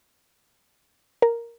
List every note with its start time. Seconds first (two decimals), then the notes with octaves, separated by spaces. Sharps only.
1.22 A#4